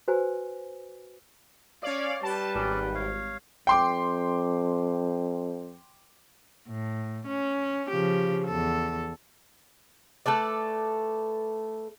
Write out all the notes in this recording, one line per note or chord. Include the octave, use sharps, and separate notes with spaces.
F#4 B4 C5 G#5
C#4 C#5 D5 F5
G3 B4 A5
G#1 C#4 D5
C#5 F5
F2 G5 C6 D6
A2
C#4
C#3 F3 G4
E2 A4
A3 A4 B4 D5